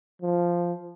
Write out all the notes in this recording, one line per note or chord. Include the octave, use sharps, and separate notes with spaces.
F3